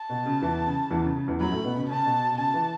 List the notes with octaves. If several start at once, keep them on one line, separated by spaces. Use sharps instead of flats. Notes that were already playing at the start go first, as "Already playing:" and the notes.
Already playing: A5
B2
C#3
E2 E3
C#3
E2 E3
C#3
C#3
E2 E3
F#2 F#3 B5
A2 A3
B2 B3
C#3 C#4
C#3 C#4 A5
B2
B2
C#3 A5
E3